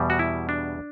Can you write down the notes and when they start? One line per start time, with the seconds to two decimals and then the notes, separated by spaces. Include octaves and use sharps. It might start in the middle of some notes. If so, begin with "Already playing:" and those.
Already playing: E2 B2 G3
0.10 F#4
0.19 E4
0.49 D4